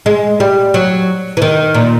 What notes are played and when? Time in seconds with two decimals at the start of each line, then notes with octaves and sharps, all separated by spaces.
0.06 G#3
0.40 G3
0.74 F#3
1.37 E3
1.42 D#3
1.75 A#2